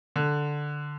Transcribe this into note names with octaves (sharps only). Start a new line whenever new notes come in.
D3